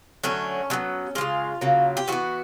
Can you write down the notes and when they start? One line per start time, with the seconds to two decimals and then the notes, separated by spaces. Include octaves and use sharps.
0.24 D3 F#3 A3 C#4
0.70 D3 F#3 B3
1.15 F3 G#3 F4
1.21 C#3
1.61 C#3 F#3 A#3
1.97 G4
2.08 E3 G#3 F#4
2.12 B3